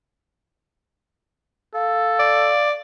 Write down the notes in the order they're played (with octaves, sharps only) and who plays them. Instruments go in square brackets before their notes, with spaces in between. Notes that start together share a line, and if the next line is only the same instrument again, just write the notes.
[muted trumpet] A4 [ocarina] F5
[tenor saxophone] D5